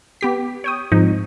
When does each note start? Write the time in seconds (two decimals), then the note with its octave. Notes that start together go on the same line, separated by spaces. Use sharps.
0.21 B3 G4 B6
0.64 C#5 G5 D#6
0.92 G#2 F3 C4 D#4